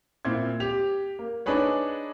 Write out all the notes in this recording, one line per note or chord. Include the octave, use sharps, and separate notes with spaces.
A#2 C4 E4 G#6
G4 F7
A#3
D4 D#4 G#4 B4 C#5